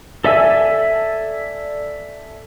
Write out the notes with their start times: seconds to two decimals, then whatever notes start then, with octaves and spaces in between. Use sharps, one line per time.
0.24 A4 D5 E5 G#5 E6